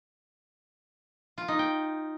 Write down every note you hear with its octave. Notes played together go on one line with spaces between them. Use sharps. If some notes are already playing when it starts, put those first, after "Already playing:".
F4
D#4
G5